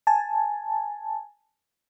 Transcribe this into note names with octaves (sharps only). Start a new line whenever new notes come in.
G#5 A5